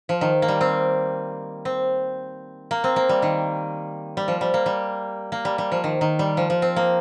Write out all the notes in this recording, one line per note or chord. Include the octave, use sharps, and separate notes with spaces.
F3
D#3
A#3
G3
C4
C4
A#3
C4
A#3
G3
D#3
G3
F3
G3
A#3
G3
A#3
G3
G3
F3
D#3
D#3
G3
F3
F3
C4
A#3